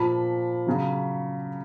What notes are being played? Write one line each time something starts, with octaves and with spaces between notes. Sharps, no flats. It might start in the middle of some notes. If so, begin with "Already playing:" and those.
Already playing: A#2 F3 A5 B5
C#3 F#3